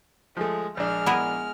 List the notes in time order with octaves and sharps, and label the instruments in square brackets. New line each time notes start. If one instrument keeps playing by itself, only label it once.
[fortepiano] F3 A3 [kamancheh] G#3
[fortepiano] A#1 D4 [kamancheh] G#3 F6
[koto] B3 E4 A#4